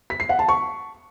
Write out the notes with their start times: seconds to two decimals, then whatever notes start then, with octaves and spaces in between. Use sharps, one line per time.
0.10 B6
0.20 C7
0.29 F#5
0.39 A5
0.49 C#6